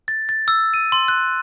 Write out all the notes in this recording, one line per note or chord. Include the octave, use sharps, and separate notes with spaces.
A6
A6
E6
D#7
C6
F#6